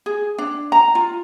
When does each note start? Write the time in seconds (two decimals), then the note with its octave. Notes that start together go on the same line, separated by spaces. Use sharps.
0.06 G#4
0.38 D4
0.72 A#5
0.95 F4